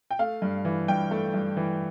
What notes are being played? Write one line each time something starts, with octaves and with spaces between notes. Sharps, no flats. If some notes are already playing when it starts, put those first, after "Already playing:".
G5
A3 F5
G2
E3
G2 G5
A3
G2
E3